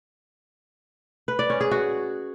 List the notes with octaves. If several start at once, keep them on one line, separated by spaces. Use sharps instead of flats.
B4
D5
C#4
G#4
F#4